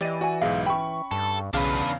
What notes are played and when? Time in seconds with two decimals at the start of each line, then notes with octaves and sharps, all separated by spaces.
0.01 E3 G4 D5 D#5 A6 D#7
0.21 F#4 D5 G#5
0.41 B1 G#2 G#4 D#5 F5
0.66 C#4 G#4 G5 B5 C#6
1.11 G2 A4
1.53 B1 E2 C#3 D4 B4 F5